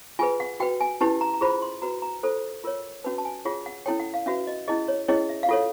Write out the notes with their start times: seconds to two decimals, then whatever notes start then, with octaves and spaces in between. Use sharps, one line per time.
0.19 F4 G#4 B4 G#5
0.40 F#5
0.60 F#4 B4 G5
0.81 G#5
1.01 C#4 E4 G4 B4 A5
1.21 A#5
1.34 A#5
1.41 F4 G#4 C5 B5
1.62 C6
1.82 F#4 B4 A#5
2.02 A#5
2.23 F4 A4 C5
2.64 F4 A#4 C#5
3.04 C#4 F#4 B4 A5
3.18 A5
3.25 G#5
3.45 F4 G#4 C#5 F#5
3.66 F#5
3.86 C#4 E4 A4 C#5 G5
4.00 F#5
4.14 F5
4.26 C#4 F#4 B4 E5
4.47 D#5
4.68 C#4 E4 G#4 D#5
4.88 C#5
5.08 C#4 E4 G#4 C#5 D#5
5.29 E5
5.43 F5
5.49 F4 A4 C#5 F#5